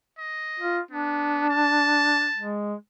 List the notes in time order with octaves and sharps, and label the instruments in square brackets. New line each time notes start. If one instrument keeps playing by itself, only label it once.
[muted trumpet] D#5
[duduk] F4
[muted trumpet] B3 [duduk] D4
[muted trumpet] A5
[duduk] G#3